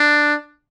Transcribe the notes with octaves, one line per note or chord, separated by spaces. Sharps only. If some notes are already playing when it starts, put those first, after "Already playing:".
Already playing: D4